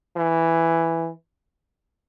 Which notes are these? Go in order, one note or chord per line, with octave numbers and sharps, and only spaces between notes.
E3